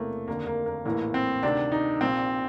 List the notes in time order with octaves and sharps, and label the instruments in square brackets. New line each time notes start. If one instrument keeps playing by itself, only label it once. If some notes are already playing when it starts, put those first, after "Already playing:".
Already playing: [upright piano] E1 E2 C3 E3 A3 A#3
F1 D#2 D3 A#3
A#3
A#3
A#1 A2 E3 A#3
C4
D2 C3 D#3 D4
D#4
A#1 A#2 C4